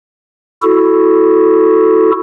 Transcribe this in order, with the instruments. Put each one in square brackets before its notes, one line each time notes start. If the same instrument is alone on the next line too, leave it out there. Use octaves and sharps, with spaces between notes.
[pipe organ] E4 F#4 A4